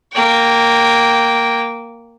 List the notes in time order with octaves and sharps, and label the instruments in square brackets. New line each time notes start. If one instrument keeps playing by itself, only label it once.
[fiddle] A#3 G5